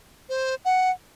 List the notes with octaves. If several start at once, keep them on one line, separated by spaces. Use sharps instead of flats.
C5
F#5